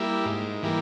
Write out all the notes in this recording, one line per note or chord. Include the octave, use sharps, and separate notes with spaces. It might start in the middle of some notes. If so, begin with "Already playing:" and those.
Already playing: G3 A#3 E4
G#2
E3 G3 A#3